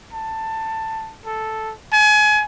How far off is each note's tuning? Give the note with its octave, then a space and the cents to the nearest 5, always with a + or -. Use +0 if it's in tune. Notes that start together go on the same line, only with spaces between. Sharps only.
A5 +15
A4 -5
G#5 +30